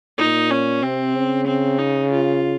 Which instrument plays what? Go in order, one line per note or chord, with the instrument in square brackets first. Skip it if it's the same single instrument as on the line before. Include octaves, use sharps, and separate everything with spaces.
[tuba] A#2 [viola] D#4
[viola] C#4
[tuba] C3 [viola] C4
[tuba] C#3
[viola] C4
D#4
F4